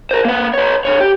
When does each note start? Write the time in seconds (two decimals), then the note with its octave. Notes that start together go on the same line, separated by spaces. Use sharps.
0.11 A#4 C5
0.25 A#3 B4
0.54 B4 C#5
0.85 D3 C#5
1.00 G4